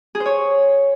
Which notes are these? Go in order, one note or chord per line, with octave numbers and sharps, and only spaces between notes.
G#4
C5
C#5